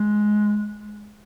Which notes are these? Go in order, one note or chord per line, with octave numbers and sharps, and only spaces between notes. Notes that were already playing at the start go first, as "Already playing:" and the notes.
Already playing: G#3